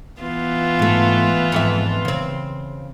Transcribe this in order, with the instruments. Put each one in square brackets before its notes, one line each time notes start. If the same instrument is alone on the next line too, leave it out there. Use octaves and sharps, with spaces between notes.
[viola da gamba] E3 B3 F4
[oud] G#2 A3
F2 G#2 E5
C#3 C4